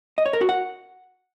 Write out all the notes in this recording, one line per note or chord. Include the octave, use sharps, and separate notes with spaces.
D#5
C#5
A#4
F#4
F#5